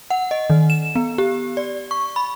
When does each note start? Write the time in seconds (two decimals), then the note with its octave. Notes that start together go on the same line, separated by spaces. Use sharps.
0.10 F#5
0.31 D#5
0.50 D#3
0.70 E7
0.95 B3
1.18 G4
1.57 D5
1.91 C#6
2.16 B5